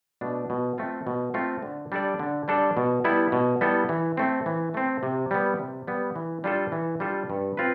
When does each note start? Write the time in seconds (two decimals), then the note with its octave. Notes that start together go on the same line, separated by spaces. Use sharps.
0.21 B2 A3 D4
0.50 B2
0.78 A3 C4 F4
1.07 B2
1.34 A3 C4 F4
1.63 D3
1.92 G3 D4 A4 D5
2.19 D3
2.48 G3 D4 A4 D5
2.77 B2
3.04 G3 B3 E4 A4
3.32 B2
3.61 G3 B3 E4 A4
3.89 E3
4.17 A3 C4
4.46 E3
4.74 A3 C4
5.03 C3
5.31 G3 B3
5.59 C3
5.87 G3 B3
6.16 E3
6.44 G3 D4 F4 A4
6.72 E3
7.00 G3 D4 F4 A4
7.30 G2
7.57 C4 F4 B4